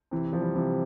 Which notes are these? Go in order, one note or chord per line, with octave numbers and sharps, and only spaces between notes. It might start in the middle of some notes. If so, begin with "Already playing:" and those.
C3 E3
F3
E3 G3
C3 E3